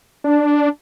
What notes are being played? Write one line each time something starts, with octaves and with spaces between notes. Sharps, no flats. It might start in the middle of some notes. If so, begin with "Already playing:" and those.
D4